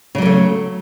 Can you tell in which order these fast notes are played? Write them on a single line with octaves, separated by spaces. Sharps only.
C#3 F#3 A#3 A3